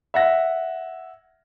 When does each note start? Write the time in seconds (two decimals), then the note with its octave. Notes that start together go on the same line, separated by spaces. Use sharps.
0.14 E5 F#5 A#6